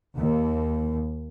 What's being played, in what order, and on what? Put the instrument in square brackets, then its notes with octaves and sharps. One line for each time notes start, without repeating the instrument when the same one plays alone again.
[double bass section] D#2